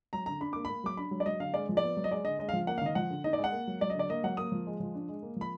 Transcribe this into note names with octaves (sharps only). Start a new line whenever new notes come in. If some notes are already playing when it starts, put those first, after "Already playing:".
F#3 A#5
D3 A#5
D4 B5
A#3 D6
A#3 B5
F#3 D6
D4 B5
F#3
D5
F#3 D#5
D3 F5
G#3 D5
F3
D5
B3
F#3
D#5
G#3 D5
D3 D#5
G#3 D#5
F5
F3
A#3 F#5
F5
D#3 D#5
F3 F#5
D3
D#4 D#5
D5
G#3
F#5
A#3
F#3
F#3 D5
D#5
D3 D5
A#3 D#5
F#3 F#5
A#3 D#6
F3
G#3
F3
D4
G#3
A#3
F3 B5